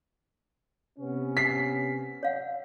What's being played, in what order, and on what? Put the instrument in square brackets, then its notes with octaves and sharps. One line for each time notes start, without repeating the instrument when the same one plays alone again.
[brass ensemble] C3 B3 C#4
[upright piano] B6 C7
[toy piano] C#5 F5 F#5